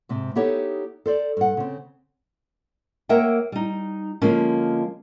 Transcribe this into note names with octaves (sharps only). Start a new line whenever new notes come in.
G#2 C3
B3 D#4 E4 G4 A4 C#5
A4 C5 D5
G2 F#5
C#3 C4
A#3 A#4 C#5 E5 F#5 G5
G3 D#4
D3 F3 G#3 A#3 C#4